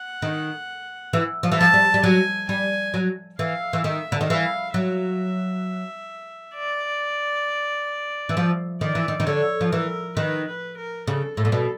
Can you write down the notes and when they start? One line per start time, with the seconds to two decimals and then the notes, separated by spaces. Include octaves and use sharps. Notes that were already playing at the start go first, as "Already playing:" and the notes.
Already playing: F#5
0.22 D#3
1.13 E3
1.43 F3
1.52 E3
1.59 F3 A5
1.74 G3
1.94 G3
2.04 F#3 G#5
2.49 G3 G#5
2.94 F#3
3.39 E3 F5
3.73 E3
3.84 D#3 E5
4.12 D3
4.21 D#3
4.29 E3 F5
4.74 F#3 E5
6.55 D5
8.29 E3
8.37 F3
8.81 D#3 D5
8.95 E3
9.08 D#3
9.20 D#3
9.26 D3 C#5
9.61 F3
9.72 E3 A#4
10.17 D#3 B4
10.47 B4
10.77 A#4
11.07 C#3 A4
11.37 A2 A4
11.45 A#2
11.52 B2